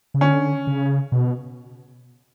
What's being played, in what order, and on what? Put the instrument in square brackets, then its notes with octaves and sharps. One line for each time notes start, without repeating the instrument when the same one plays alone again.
[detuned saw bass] C#3
[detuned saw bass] D3 [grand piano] C#4
[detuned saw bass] C#3
B2